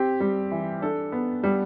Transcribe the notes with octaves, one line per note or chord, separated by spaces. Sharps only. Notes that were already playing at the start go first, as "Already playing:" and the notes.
Already playing: C4 G4
G3
E3
D4 A4
B3
G3